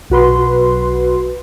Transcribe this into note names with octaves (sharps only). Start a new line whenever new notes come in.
B1 F#4 B4 C6